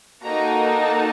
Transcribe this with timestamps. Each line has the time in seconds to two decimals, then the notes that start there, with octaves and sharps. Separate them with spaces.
0.23 A#3 D#4 F#4 A4 A#5
0.82 A5